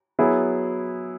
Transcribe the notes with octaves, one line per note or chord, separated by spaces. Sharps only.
F#3 B3 E4 G#4